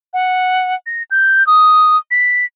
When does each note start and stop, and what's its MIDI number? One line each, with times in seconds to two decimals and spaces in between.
0.13 0.75 78
0.86 1.03 94
1.11 1.46 91
1.47 1.97 87
2.11 2.45 95